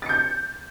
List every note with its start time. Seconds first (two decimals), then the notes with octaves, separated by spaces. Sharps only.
0.02 A6
0.06 C#7
0.09 G6